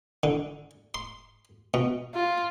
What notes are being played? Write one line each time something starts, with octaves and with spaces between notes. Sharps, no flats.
D3
C6
B2
F4